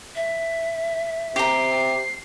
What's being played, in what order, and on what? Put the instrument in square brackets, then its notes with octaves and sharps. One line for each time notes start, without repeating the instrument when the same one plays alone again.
[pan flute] E5
[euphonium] C3 [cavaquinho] G4 A#5 [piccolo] C7